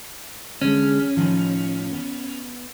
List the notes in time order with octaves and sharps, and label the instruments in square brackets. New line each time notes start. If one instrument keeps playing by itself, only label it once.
[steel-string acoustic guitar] D3 G#3 [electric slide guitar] C#4
[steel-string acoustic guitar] A2 D#3 F3
B3